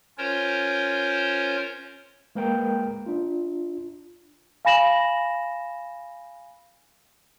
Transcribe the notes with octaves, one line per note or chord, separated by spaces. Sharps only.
C#4 F4 A#4 C5 C#5
G#3 A#3 A#4 B4 G5
D4 F4
F5 G#5 B5 A#6 E7 F#7